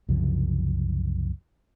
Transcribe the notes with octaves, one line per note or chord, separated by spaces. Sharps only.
C2 F#2 C#3 F3